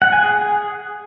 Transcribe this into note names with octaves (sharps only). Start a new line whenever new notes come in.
F#5
G#5
G#4